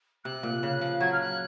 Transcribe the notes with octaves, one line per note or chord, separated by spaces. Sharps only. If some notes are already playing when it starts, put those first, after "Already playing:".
C3 F#6
A#2
C#3
F3
F#3 G#6
F6
F#6